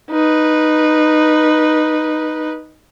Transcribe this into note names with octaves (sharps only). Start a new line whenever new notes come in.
D#4 B4